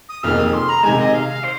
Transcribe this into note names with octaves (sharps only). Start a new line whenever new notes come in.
D#6
F1 F2 D#3 A#3 G#4 F6
D#6
C6
A#5
C3 D#3 G#3 G#5
D#5
F5
F5
C5